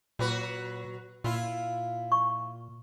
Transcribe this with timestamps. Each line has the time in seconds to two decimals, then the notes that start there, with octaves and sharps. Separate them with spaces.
0.19 A#2 F#3 F#4 B4
1.24 A#2 E4 F4
2.12 C#6